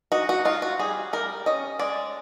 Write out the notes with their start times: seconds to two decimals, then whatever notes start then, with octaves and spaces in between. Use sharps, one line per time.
0.12 D#4 F#4
0.29 F#4
0.45 D#4 F4
0.62 F#4
0.79 G3 G#4
1.13 G3 A#4
1.46 C#4 D#5
1.79 G#3 D5